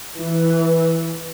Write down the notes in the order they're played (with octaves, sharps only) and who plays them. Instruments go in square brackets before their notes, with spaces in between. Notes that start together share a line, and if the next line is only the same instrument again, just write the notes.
[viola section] E3